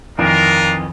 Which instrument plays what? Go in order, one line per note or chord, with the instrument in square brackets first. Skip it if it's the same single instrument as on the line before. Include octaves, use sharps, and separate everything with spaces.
[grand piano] F2 D#3 E3 [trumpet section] D4 F4 A#4